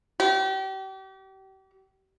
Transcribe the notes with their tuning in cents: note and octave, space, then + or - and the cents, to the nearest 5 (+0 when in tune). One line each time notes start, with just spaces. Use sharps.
G4 -35